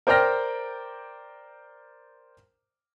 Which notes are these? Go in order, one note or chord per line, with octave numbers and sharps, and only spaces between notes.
A#4 C5 D5 G5 F6 A#6